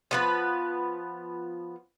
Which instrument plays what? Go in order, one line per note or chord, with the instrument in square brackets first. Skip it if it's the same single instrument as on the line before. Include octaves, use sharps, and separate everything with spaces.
[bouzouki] F3 B3 B4